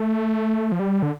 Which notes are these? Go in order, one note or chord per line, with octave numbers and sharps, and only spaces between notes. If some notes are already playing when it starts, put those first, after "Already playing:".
Already playing: A3
F3
G3
D3